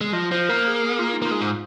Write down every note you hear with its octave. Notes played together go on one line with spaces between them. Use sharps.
G#3
F3 D#5
F3 C5
A#3 A#4
G#4
G#4
F4
D#4
A#3 F4
G#3
G#2